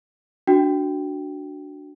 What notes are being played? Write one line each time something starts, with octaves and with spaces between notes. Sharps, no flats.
D4 F#4 G5